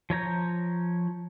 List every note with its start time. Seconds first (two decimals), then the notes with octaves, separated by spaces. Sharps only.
0.10 F3 C#5 A#5 G6